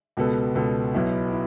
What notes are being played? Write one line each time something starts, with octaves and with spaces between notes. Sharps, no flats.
C#2 B2 B3 A4
C#2 B2 B3 A4
B1 B2 B3 E4
E4